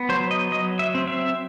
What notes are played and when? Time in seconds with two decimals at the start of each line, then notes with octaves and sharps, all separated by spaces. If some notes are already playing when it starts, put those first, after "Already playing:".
Already playing: B3
0.09 F#3 C5
0.31 D#5
0.51 F#3 D#5
0.79 E5
0.95 C4
1.08 E5